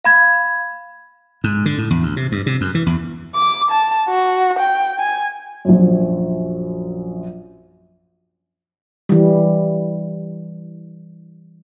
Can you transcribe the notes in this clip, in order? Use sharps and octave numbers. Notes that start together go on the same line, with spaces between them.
F5 B5 G#6
G#2
D3
A2
E2
D2
C3
G2
C3
F#2
E3
E2
D6
A5
F#4
G5
G#5
A#1 F#2
E3 G3